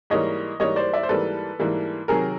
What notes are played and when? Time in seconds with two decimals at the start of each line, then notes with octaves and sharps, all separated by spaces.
0.10 G#2 E3 G3 A#3 C#5 D#5
0.60 G#2 E3 G3 A#3 C#5 D#5
0.76 C5 D5
0.93 D5 E5
1.03 C5
1.09 G#2 E3 G3 A#3 A4 B4
1.59 G#2 E3 G3 A#3
2.08 C3 D#3 F#3 G#4 A#4